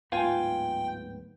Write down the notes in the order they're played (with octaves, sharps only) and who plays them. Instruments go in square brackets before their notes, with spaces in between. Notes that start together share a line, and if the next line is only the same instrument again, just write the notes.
[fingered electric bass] D1 G#2 B3 [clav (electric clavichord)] F4 G#5 [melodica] G5